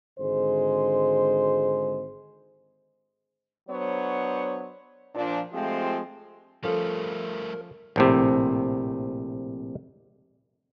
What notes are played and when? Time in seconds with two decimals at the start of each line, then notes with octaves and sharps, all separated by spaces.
0.20 G#1 D3 G#3 C5
3.69 F#3 B3 D4 C5 C#5
5.15 A#2 F3 D4
5.53 F3 G#3 A3 C4 F4 G4
6.64 F3 G3 A3 C#4 A4 A#4
7.96 A#1 A2 C3